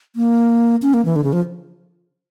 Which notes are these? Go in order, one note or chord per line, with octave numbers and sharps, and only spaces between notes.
A#3
C#4
A#3
E3
D3
C#3
F3